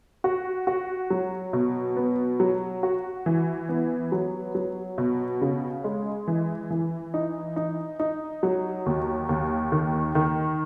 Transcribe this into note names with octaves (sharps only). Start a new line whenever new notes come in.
F#4
F#4
F#3
B2
B3
F#3
F#4
E3
B3
F#3
F#3
B2
C#3
G#3
E3
E3
D#4
D#4
D#4
F#3
D#2
D#2
D#3
D#3